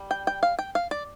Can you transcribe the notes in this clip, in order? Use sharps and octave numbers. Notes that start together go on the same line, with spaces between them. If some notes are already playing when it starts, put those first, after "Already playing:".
Already playing: G3
G5
G5
F5
G5
F5
D5